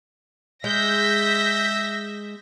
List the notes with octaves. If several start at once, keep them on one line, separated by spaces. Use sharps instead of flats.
G#3 E5 G6 A#6 B6